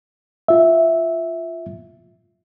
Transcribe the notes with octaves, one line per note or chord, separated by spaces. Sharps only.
F4 E5